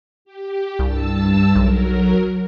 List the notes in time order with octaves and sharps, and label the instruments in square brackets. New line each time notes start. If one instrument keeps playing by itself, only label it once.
[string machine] G4
[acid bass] C2 [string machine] G2 A5 E6
[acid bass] B1 [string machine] F#3 A#4